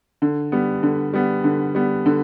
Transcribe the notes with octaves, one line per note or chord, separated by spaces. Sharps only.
D3
G3 B3
D3
G3 B3
D3
G3 B3
D3